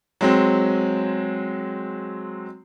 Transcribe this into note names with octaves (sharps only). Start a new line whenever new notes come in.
F#3 G#3 C4